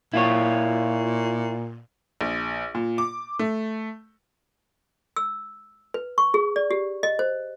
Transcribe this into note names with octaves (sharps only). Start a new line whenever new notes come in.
A#2 E4 F4 C#5
A#1
A#2
D6
A3
E6
B4
C#6
G#4
D5
G4
D#5
C5